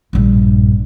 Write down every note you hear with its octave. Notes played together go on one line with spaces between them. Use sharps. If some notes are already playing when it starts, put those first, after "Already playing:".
A#1 G2